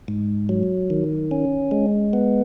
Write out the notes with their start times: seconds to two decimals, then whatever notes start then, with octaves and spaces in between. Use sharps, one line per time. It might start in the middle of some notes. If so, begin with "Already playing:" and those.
0.08 G#2
0.49 F#3
0.90 D#3
1.31 C#4
1.71 G#3
2.13 B3